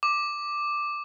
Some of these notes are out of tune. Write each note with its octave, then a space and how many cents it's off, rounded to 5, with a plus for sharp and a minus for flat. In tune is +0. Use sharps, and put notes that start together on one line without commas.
D6 +5